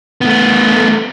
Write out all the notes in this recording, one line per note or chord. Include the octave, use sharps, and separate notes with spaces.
A3 B3